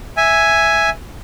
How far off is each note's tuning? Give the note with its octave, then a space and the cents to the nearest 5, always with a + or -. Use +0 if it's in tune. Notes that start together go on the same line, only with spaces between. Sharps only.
E5 +0 G#5 +0